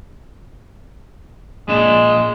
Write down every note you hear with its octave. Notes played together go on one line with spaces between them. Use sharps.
A#2 G#3 D4